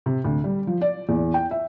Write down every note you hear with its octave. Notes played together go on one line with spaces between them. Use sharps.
C3
D2
G3
F3
D5
E2
G5
E5